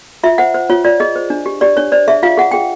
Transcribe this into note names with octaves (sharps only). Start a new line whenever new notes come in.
F4 E5
C5 F#5
C5
F4 C#5
F4 D5
G#4 D#5
C5
D4
G4
G4 D5
D4 C#5
C5 D5
G#4 E5
F4 F5
G#4 F#5
G#4 G5